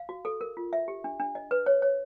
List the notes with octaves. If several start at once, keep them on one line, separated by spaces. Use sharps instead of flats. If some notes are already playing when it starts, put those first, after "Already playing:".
Already playing: F5
F#4
A4
A#4
F4
E5
G4
D4
D4
D#5
B4
C#5
C#5